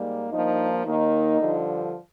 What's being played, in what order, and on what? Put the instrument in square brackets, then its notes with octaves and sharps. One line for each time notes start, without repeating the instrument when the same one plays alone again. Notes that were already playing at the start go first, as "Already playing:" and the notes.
Already playing: [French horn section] G#2 G3 A#3
G2 F3 A#3 D#4
D#2 D#3 A#3 D#4
G2 D3 F3